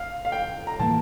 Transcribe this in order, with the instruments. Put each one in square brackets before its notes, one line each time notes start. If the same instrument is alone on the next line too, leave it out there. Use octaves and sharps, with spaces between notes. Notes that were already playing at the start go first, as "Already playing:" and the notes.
Already playing: [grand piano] F5
F5
G5
A#5
[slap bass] A2 E3 A#3 [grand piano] A5